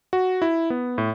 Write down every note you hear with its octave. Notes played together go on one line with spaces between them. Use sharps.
F#4
E4
B3
A2